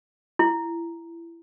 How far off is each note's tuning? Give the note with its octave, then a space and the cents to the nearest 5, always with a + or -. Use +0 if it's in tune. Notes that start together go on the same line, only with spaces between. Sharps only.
E4 +25